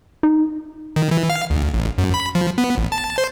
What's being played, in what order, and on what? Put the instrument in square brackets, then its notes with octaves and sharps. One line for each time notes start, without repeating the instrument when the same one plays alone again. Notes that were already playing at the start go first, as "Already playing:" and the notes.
[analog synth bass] D#4
[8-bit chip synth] D#3
E3
F5
D2
A1
F#2
B5
F3
B3
A1
A5
C5